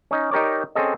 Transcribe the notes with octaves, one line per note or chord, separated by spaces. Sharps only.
C#4 D#4
D#4 G4 A#4 C#5 D5
C4 C#4 G#4 A4 D#5